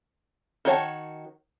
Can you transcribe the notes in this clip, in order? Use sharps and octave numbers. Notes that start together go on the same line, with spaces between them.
D#3 F#4 C#5 A5